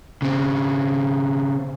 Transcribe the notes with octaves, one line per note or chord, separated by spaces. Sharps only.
C#3 C4